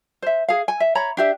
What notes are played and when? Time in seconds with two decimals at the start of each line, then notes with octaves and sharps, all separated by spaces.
0.22 C5 E5
0.49 G#4 F5
0.68 G#5
0.80 E5
0.95 C#5 A#5 B5
1.17 D4 G4 E5